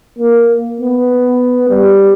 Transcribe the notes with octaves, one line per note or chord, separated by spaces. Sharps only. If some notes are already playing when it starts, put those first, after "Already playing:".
A#3
B3
G3